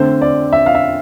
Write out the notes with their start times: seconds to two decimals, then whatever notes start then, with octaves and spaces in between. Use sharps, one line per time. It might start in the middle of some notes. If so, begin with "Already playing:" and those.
Already playing: D3 A3 C4 C5
0.22 D5
0.53 E5
0.66 F5
0.75 E5